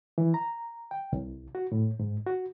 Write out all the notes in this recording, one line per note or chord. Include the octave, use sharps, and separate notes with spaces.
E3
A#5
G5
C2
F#4
A2
G#2
F#4